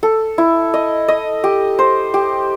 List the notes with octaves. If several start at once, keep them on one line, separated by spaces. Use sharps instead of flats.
A4
E4
D#5
D#5
G4
C5
G4